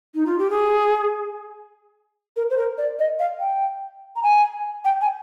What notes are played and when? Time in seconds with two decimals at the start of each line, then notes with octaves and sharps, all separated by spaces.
0.15 D#4
0.26 F4
0.38 G4
0.50 G#4
2.36 A#4
2.50 C5
2.57 A#4
2.78 D5
2.99 D#5
3.19 F5
3.40 G5
4.16 A#5
4.23 G#5
4.85 G5
5.01 G#5